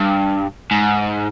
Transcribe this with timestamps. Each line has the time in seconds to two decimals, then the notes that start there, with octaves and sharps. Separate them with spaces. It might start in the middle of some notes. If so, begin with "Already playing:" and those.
Already playing: G2
0.71 G#2